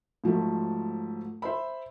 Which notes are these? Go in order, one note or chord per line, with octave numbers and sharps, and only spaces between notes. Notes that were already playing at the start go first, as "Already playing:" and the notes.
G#2 F3 F#3 A3
C5 E5 B5